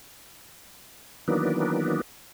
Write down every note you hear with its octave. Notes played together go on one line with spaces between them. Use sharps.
D#3 E3 F#3 A#3 B3 D4